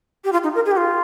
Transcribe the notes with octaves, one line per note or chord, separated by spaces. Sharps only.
G4
F4
D#4
A#4
G#4
G4
F4